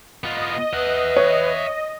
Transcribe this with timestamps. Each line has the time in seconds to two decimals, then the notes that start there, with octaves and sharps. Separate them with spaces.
0.24 B3 F4 D#5
0.73 B4 E5 F#5
1.17 C#5